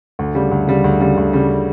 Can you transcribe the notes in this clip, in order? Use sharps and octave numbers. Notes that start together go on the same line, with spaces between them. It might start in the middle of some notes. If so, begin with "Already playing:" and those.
D2
C#3 G3
D2
C#3 G3
D2
C#3 G3
D2
C#3 G3